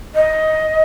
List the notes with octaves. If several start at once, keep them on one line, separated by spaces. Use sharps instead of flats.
D#5